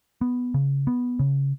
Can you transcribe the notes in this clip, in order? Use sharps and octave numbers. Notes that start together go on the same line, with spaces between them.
B3
C#3
B3
C#3